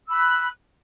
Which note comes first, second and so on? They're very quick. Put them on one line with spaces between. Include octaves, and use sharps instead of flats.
E6 B5 F#6